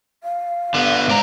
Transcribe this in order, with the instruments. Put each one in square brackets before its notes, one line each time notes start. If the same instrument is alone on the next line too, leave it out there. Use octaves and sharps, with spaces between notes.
[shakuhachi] F5
[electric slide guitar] D3 B3
G#2 D5 A#5